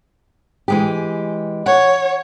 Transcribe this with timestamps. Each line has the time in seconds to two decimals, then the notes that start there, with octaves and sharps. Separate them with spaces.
0.68 E3 G#3 G4
1.66 C#5 F#5